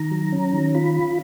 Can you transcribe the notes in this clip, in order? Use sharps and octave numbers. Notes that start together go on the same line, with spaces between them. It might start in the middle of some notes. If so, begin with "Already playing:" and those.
Already playing: D#3 A#5
F#3
C#4
D#3
F4 B5